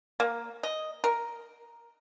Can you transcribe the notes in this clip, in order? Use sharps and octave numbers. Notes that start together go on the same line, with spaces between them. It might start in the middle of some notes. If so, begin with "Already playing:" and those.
A#3
D#5
A#4